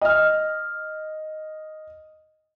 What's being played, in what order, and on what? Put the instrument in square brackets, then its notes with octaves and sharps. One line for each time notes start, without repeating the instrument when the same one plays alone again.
[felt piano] D#5 F6